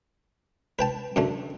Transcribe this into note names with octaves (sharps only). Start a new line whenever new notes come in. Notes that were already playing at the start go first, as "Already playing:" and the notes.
B4 G5 A5
F#2 D3 A3